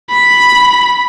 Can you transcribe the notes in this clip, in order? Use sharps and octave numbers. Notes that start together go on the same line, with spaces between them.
B5